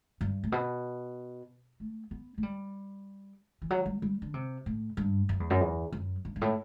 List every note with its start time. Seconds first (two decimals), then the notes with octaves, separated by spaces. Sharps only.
0.21 G2
0.44 A2
0.52 B2
1.80 A3
2.11 B3
2.38 A3
2.43 G3
3.62 E3
3.70 F#3
3.86 G3
4.02 G3
4.22 D3
4.34 C3
4.66 A2
4.97 G2
5.29 F#2
5.40 E2
5.50 F#2
5.61 E2
5.92 F#2
6.25 G2
6.36 G2
6.41 A2